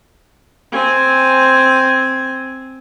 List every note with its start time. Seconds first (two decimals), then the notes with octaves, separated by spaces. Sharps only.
0.72 C4 G#5